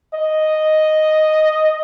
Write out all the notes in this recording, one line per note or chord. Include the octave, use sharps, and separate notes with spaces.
D#5